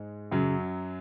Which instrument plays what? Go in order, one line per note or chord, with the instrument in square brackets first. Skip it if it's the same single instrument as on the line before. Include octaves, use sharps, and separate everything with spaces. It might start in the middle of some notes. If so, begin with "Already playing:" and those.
Already playing: [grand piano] G#2 G#3
[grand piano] F#2 F#3 [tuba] C#3